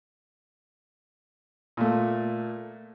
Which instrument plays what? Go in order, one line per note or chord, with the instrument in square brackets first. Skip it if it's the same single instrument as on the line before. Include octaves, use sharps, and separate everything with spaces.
[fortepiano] A#2 A3